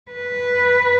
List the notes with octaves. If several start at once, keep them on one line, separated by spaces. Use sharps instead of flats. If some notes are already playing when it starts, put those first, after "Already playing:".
B4